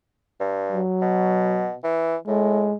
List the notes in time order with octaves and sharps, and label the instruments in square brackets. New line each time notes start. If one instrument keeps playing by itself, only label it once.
[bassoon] G2
[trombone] F#3
[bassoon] B2
E3
[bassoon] A2 [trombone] G#3